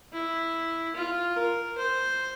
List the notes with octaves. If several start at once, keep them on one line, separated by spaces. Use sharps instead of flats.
E4
F4
A#4
C5